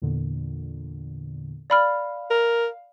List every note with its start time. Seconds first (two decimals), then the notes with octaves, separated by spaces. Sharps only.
0.02 E2 A#2 D3
1.70 D5 F5 B5 F6
2.30 A#4